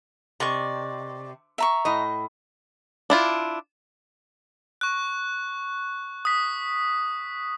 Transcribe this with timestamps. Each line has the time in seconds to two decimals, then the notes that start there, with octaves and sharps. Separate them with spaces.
0.40 C3 D5 D#5 C#6
1.58 E5 A#5 C#6
1.85 A2 D#5
3.10 D4 E4 F4
4.81 C#6 F#6
6.25 D#6 B6